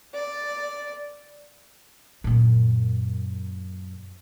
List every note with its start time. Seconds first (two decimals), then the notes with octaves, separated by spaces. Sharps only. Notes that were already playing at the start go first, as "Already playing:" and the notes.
0.14 D5
2.24 F#2 A#2